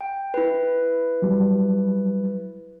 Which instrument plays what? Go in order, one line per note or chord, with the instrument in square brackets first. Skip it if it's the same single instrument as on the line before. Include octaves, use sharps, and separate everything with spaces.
[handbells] G5
E4 B4
[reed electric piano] F#3 G3